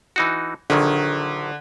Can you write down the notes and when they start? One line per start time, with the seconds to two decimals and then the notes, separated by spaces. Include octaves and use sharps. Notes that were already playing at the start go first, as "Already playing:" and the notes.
0.16 E3 D#4 F#4
0.70 A#1 D3 D#3 F#3